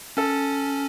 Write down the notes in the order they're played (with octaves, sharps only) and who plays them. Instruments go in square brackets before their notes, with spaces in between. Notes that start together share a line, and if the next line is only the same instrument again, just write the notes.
[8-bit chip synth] C#4 [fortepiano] A4